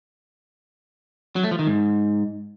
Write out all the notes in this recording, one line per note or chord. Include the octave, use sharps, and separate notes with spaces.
F#3
A3
F3
D#3
G#2